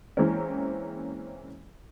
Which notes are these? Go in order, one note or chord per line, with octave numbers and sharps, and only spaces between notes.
E3 G#3 A#3 C4 C#4